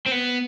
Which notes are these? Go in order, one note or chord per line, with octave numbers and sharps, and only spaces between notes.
C4
B3